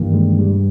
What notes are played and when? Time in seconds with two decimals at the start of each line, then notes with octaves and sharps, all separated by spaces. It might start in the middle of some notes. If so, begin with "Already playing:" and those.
Already playing: G2 B2 D#3 E3 A#3
0.14 G#3
0.39 G3